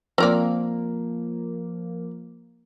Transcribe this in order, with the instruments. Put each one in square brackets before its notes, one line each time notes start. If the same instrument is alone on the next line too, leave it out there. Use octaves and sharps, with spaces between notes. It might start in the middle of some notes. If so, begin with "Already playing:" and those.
[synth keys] F3 A#3 [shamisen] C4 A#4 D5